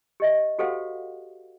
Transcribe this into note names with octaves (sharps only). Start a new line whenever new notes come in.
G4 D#5 E5
F#4 G4 A4 C5 F5 F#5